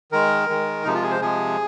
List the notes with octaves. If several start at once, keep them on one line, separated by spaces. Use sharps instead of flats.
D#3 G#3 A#4
D#3 G#3
C3 F3 G#3 D#4
F4
G#4
C5
C3 F3 G#3 G#4